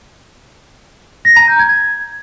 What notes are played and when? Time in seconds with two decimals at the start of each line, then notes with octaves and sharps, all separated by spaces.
1.25 A#6
1.36 A#5
1.48 G6
1.59 G#6